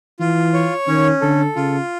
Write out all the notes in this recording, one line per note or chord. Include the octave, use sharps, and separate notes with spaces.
E3 F4
C#5
D#3 C#4
D3 A4
C#3 F4